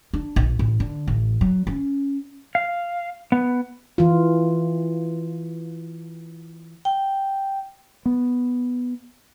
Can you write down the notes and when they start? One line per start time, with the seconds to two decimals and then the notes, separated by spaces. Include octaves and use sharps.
0.14 D4
0.36 A#1
0.59 A1
0.80 D3
1.07 A1
1.41 F#3
1.67 C#4
2.55 F5
3.32 B3
3.98 E3 F4
6.85 G5
8.06 B3